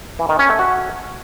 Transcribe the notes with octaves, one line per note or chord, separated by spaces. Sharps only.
E3
D#3
C#4
A3
F#4